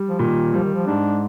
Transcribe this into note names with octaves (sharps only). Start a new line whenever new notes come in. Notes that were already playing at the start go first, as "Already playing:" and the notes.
Already playing: G3
F3
A#2 D#3
F3 G3
D#3
F3
G#2 D4